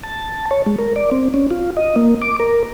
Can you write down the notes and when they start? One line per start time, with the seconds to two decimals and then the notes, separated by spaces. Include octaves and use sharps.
0.04 A5
0.51 C#5
0.66 G#3
0.79 A#4
0.96 D5
1.11 C4
1.34 C#4
1.51 F4
1.77 D#5
1.96 A#3
2.22 D6
2.40 A#4